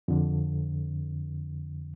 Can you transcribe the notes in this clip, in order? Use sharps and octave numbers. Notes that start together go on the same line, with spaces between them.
F2 D3